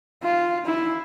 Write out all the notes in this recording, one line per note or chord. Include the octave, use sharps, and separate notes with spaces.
F4
E4